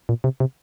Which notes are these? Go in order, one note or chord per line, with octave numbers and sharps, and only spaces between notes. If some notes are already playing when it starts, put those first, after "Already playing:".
A#2
C3
C3